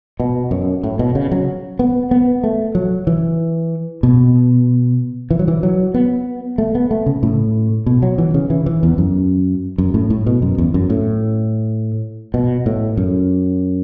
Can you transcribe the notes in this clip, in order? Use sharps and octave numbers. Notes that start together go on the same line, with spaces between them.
B2
F#2
A2
B2
C#3
F#3
B3
B3
A3
F#3
E3
B2
E3
F#3
E3
F#3
B3
A3
B3
A3
C#3
A2
B2
F#3
E3
C#3
E3
E3
E2
F#2
F#2
A2
A2
B2
F#2
E2
F#2
A2
B2
A2
F#2